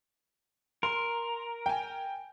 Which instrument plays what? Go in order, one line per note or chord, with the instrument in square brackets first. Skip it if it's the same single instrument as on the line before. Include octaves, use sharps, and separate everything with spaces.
[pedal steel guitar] A#4 [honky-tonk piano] C6
[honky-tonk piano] G5 G#5